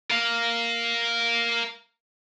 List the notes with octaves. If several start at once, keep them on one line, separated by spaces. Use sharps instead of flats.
A#4 F5